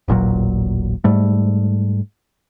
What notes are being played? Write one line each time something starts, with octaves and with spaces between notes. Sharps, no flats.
D#1 A1 A#2 F#3
G#2 G3 A3